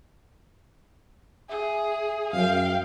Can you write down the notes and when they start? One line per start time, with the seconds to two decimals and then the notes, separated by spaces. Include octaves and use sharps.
1.49 G#4 E5
2.33 F#2 F5 G5